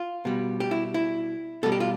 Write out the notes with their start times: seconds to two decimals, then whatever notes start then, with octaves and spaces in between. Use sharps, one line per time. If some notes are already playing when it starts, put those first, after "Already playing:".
Already playing: F4
0.25 B2 G3
0.60 G4
0.71 E4
0.94 E4
1.63 B2 G3 A4
1.72 G4
1.80 F4